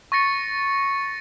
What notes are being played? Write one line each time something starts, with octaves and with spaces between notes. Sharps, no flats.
C#6 A6 A#6 C#7